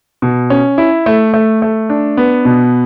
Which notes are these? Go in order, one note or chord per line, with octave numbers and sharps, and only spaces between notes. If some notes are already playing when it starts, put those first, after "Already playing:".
B2
C#4
E4
A3
A3
A3
D4
B3
B2